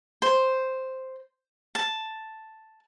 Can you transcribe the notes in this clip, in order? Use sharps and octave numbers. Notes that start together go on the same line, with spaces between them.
C5
A5